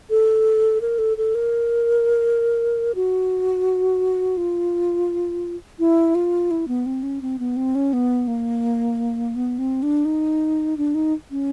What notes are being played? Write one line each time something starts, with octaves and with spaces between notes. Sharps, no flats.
A4
A#4
A4
A4
A#4
F#4
F4
E4
F4
E4
B3
C4
C#4
C4
B3
C4
C#4
B3
A#3
B3
C4
D4
D#4
D4
D#4
C#4